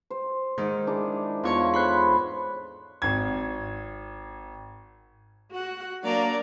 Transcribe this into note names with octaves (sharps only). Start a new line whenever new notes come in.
C5
G#2 D#3
D4 E4 G#4
E2 F4 C#5 C#6
A4 C5 B5 C6 F#6
G#1 G#6
F#4 F#5
F#3 A#3 D4 A#4 D5 A#5